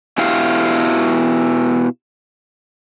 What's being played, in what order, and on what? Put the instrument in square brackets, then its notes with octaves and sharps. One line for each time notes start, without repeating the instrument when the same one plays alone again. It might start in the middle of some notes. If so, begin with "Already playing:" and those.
[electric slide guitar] B2 E4 G4 F5